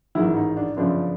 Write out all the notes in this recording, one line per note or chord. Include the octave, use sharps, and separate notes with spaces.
A1 G#2 D#3 E4
D#4
D4
G1 F#2 C#3 F3 D4